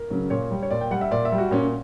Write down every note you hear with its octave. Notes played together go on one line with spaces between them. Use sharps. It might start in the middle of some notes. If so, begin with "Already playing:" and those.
Already playing: A#4
C#3 F#3
A#2 C#5
G3
C#5
A#2 D5
G5
G3 F#5
E5
A#2 D5
E5
G3
F#4
A#2 C#4